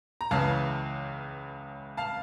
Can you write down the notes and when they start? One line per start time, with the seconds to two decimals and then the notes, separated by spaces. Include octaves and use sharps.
0.21 A#5
0.31 C#2 C#3 E3 F5 A5
1.97 F5 A5